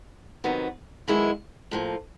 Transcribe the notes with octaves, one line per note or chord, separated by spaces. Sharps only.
C3 D#3 F#3 B3
F#2 D#3 G#3 B3 E4
A2 F3 A#3